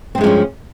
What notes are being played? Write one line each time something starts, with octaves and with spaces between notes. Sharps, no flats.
G2 F3 G#3 C4 C#4